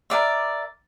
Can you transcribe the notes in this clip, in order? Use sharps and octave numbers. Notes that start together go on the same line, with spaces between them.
A#4 D5 E5